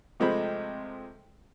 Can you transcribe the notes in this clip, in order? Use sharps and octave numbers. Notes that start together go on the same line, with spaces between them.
C3 F3 G#3 A3 C5 B5